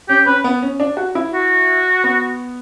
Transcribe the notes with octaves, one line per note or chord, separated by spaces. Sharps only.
C#4 G4
C#4 B4
B3
C#4
D4
F#4
E4
F#4
B3